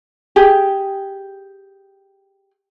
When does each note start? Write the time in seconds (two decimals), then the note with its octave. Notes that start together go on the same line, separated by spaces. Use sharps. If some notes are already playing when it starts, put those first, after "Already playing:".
0.36 G4 G#4